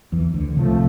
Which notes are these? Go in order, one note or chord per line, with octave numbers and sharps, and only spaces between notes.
E2 E3
D2 D3
C2 A2 C3 F3 A3